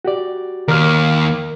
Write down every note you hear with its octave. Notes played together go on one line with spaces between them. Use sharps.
F#4 G4 D5
D#2 A#4 F6